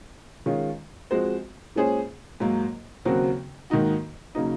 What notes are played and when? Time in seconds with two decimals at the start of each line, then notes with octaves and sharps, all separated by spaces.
0.46 D#3 G#3 C#4 F4
1.11 F3 G#3 C4 F#4 C5
1.75 A#2 G#3 C#4 G#4 C5
2.40 G#2 F#3 A#3
3.05 D#2 C#3 F#3 C4 F#4
3.70 G#2 D#3 A#3 D#4 F#4
4.35 C#3 F#3 A#3 D#4